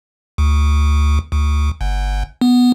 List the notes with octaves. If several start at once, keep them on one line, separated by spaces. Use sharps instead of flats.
D2
D2
G1
B3